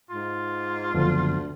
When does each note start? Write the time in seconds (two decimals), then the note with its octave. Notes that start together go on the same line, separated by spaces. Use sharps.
0.10 G#2 F4
0.95 F#1 D2 D3 F3 B3